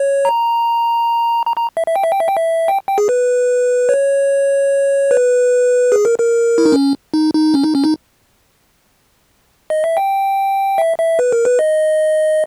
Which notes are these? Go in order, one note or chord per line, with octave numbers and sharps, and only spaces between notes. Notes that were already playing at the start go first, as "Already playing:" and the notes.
Already playing: C#5
A#5
A#5
A#5
E5
E5
G5
E5
G5
E5
G5
E5
G5
G5
G#4
B4
C#5
B4
G#4
A#4
A#4
E4
D#4
C#4
D#4
D#4
C#4
D#4
C#4
D#4
D#5
E5
G5
E5
E5
B4
A#4
B4
D#5